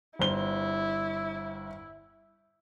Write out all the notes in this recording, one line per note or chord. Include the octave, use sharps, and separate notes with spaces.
G1 E4 C5 G7